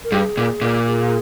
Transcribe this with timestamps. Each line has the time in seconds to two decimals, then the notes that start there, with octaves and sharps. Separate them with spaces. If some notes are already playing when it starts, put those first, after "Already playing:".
0.04 A#4
0.12 G2 G#4
0.37 A#2
0.62 A#2
0.86 G#4